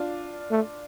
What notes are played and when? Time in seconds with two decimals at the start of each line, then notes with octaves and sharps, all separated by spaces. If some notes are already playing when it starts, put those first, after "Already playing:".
Already playing: D4 F4
0.51 A3